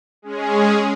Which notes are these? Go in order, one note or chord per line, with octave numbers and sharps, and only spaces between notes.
G#3 C#4 G#4